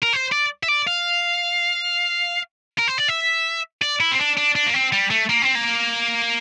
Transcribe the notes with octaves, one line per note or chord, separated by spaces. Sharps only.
A#4
C5
D5
E5
D5
F5
A#4
C5
D5
E5
D5
E4
C4
D4
D4
D4
A#3
C4
G3
A3
A#3
C4
A#3